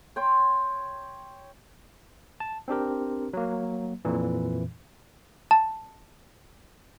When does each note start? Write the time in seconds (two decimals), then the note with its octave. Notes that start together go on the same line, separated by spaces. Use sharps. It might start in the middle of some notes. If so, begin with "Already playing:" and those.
0.16 C#5 G5 C6
2.40 A5
2.68 C4 D4 G4 A#4
3.33 F#3 A#3
4.05 F2 A#2 E3
5.51 A5